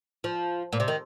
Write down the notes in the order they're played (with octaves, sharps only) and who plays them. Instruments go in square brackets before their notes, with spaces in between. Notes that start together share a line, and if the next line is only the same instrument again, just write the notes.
[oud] F3
A#2
C3
D#3